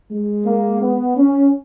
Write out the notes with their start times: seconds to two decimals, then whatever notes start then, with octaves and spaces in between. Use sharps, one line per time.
0.11 G#3
0.46 A#3
0.81 B3
1.16 C#4